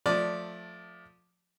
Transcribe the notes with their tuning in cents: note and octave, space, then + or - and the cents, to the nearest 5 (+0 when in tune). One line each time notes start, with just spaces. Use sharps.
F3 +25 A3 +0 D5 +0